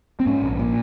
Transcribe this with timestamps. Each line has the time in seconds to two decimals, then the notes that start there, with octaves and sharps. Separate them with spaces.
0.20 C4
0.26 G#2 C#4
0.43 A#1
0.59 A#2